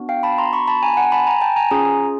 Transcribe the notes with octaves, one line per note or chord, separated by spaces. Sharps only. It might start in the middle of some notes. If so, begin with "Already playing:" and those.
Already playing: B3 D4 F#4
F5 G5
A5 B5
A#5 C6
B5 C#6
A5 B5
G#5 A#5
F#5 G#5
A5 B5
G#5 A#5
G5 A5
G#5 A#5
C#4 F4 G#4 G#5 A#5